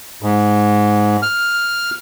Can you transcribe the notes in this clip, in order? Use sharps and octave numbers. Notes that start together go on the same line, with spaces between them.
G#2
F6